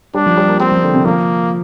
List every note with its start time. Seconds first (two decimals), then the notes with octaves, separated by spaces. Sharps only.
0.14 G3 D4
0.26 F3
0.37 G3
0.48 A#3
0.60 G3 C4
0.72 F3
0.83 D3
0.94 C3
1.05 F3 A#3